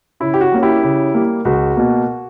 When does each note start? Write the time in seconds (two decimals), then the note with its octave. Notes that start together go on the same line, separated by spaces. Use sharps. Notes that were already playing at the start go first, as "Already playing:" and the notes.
0.20 C#3 E4
0.34 G4
0.41 F#4
0.52 G3 A#3 C#4
0.63 E4 G4
0.82 C#3
1.14 G3 A#3
1.45 C#2 F#4
1.77 B2 A#3